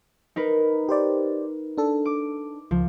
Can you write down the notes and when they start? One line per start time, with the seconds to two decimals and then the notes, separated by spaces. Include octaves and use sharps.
0.36 D#4 A#4 B4
0.89 G4 C5 D5
1.78 D4 A4
2.05 D6
2.71 C#2 F3